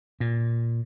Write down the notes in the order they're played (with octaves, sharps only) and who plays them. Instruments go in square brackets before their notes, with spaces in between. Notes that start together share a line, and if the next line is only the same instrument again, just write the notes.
[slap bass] A#2